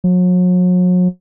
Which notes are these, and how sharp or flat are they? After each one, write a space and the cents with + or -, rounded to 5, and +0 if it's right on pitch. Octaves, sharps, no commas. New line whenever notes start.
F#3 -40